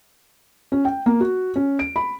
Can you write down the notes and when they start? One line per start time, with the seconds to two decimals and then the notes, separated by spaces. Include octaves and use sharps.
0.72 C#4
0.85 G5
1.06 A#3
1.20 F#4
1.56 C#4
1.79 D7
1.96 B5